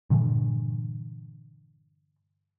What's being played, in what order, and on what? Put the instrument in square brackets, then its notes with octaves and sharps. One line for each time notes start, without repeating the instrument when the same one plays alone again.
[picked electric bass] G2 A#2 D3 E3